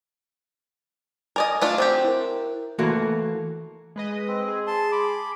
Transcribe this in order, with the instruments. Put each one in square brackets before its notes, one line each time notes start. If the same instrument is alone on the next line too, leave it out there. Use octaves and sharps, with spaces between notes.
[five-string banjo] A#4 D5 D#5 [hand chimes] G#5
[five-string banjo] A3 D4 F4
[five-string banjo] C4 F#4 G4 [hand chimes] C5
[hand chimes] E4 A#4
[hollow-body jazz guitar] E3 A3 A#3 F#4
[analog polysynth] G#3 B4 D#5
[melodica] C4
[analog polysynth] G#4
[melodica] A5 C6
B5 D6